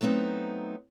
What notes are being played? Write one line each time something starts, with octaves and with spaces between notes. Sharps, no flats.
F#3 A3 B3 C4 D#4